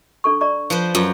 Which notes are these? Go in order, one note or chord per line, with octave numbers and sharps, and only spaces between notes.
D4 A4 C#6
D5 A#5 C#6
F3 B4 C5
F#2 F4